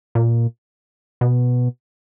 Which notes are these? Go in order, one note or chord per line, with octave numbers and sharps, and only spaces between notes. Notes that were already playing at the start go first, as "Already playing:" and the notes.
A#2
B2